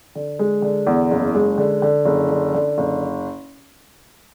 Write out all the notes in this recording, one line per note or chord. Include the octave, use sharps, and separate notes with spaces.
D3
G#3
D3
E2
F#1
G#3
D3
D3
F#1
D3
D3
F#1